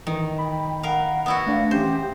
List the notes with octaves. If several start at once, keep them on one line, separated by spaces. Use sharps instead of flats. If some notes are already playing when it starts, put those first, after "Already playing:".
D#3 E3
G5 B5
A#4 F5 F#5
B3 E4 F#4
A3 D4 F5
E3 C#4 G4 C5